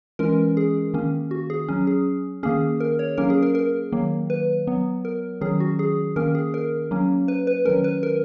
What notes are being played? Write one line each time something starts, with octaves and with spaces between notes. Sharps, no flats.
E3 G#3 C#4 A#4
G#4
D#3 A#3 C#4
F#4
G#4
F#3 C#4
G#4
D#3 A#3 C#4 G#4
A#4
C#5
F#3 A#3 C#4 A#4
G#4
A#4
A#4
D#3 F#3 A#3
B4
F#3 B3
A#4
D#3 F#3 C#4 G#4
F#4
G#4
D#3 A#3 C#4 A#4
G#4
A#4
F#3 A#3 C#4
B4
B4
D#3 F#3 C#4 A#4
B4
A#4